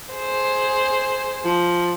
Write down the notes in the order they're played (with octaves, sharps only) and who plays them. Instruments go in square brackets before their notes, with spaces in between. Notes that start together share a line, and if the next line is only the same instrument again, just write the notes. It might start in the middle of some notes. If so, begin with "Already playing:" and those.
[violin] G#4 C5
[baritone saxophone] F3